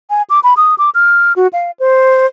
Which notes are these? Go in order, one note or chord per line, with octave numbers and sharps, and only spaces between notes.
G#5
D6
B5
D#6
D6
F6
F#4
F5
C5